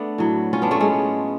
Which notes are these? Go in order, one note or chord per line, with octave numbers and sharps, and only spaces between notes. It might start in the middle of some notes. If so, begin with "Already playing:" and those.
Already playing: A3 B3 D4
A2 F#3
C#4 F4
B3 D4
A3 C#4
G#3 B3